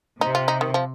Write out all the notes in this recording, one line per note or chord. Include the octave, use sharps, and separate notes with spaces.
C3 D#4
F4
D#4
D#3
F3